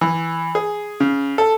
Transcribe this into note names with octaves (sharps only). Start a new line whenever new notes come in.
E3
G#4
C#3
A4